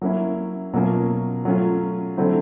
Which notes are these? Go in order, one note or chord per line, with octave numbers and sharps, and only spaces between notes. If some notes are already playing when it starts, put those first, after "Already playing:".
F#3 A#3 C#4 E4
B2 F#3 A#3 C#4 F4
F#3 A3 C#4 F4
D3 F#3 A3 C4 E4